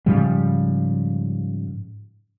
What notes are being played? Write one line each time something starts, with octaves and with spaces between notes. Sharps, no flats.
G#2 C#3 F3 G3